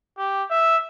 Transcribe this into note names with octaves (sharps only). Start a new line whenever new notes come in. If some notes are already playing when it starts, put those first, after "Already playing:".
G4
E5